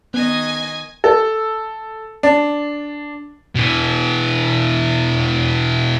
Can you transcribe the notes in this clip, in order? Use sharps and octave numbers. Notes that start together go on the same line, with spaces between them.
D#3 B3 D#5 G#5
A4
D4
B2 E3